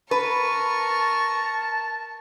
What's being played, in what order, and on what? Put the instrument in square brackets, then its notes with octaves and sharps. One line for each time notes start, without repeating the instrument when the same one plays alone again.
[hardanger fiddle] A#4 C#6 [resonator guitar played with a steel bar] B4 [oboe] A5